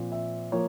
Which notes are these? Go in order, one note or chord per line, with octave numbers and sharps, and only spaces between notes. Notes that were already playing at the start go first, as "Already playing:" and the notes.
Already playing: A#2 F3 C4
E5
F3 A#3 C#5